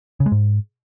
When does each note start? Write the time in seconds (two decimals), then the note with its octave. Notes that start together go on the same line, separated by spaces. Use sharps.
0.20 C#3
0.26 G#3
0.32 G#2